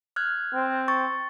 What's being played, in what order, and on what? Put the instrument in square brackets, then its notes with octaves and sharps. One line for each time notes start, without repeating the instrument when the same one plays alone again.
[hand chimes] F6 F#6 G#6
[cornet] C4
[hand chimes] C#6 A6